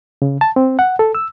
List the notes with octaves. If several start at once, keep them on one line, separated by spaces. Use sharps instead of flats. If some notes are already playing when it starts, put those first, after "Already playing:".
C#3
A5
C4
F#5
A4
E6